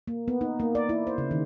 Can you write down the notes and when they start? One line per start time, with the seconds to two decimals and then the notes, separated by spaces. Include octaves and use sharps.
0.08 A#3
0.28 B3
0.41 D#4
0.60 A#3
0.75 D5
0.89 E4
1.07 C5
1.18 C#3
1.31 D#3